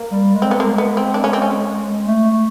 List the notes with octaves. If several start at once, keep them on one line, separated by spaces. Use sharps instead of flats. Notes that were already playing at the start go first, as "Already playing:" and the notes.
Already playing: A#3
G3
G#3
C4
B3
A#3
B3
C4
D4
C#4
C4
C#4
A3
A3